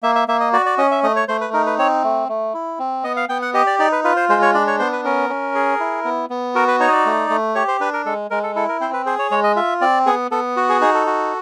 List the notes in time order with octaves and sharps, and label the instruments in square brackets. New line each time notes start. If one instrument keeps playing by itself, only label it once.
[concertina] A#3 E5
E5
A#3 E5
D#5
F#4 D5
D5
C#4 D#5
E5
A3 D#5
C#5
A3 C5
B4
D#4 A#4
B4
C4 C#5
A3
A3
E4
C4
B3 D#5
F5
B3 G5
F#5
G4 D#5
D5
D#4 D5
B4
F4 B4
C5
G#3 C5
C#5
D4 D5
C#5
B3 C5
B4
C#4 A#4
C#4
G#4
E4
B3
B3
F#4 A#4
B4
D#4 C#5
D#5
D5
A3
A3
G4 C#5
C5
D4 B4
A#4
G#3 A4
G#3 A#4
A4
E4 A4
A#4
C4 C5
B4
G#4 C5
C#5
G#3 C#5
D#5
F4 E5
C4 D5
B3 G#4
B3 A4
F#4
G#4
D#4 G#4
A4
F#4